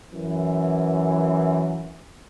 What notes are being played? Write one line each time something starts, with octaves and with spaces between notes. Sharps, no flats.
F#2 E3